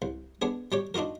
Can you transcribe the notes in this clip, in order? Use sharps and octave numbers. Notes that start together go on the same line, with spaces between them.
C2
B3 D4 G#4
G3 G4 C#5
D4 D#4 F4 F#4 A#4